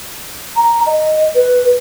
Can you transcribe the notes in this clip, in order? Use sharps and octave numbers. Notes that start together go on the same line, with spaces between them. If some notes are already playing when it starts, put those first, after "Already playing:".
A#5
D#5
B4